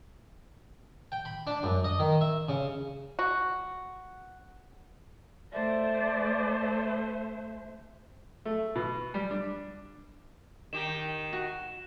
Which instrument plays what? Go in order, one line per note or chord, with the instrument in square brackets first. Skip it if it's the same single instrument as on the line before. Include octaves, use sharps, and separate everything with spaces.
[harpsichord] G5
B5
D4
F#2
D#5
D#3
E5
C#3
[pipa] F#4
[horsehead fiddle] A3 C5 [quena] D5 [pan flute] E5
[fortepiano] A3
B2
G3
D4
[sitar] D#3 G4 [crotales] E7
[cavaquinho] F#4